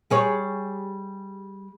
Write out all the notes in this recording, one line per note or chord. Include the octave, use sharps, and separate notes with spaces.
G3 G#4 C#5